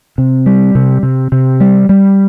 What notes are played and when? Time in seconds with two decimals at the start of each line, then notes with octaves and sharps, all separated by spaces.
0.18 C3
0.46 G3
0.75 C3
1.03 C3
1.32 C3
1.60 G3
1.89 G3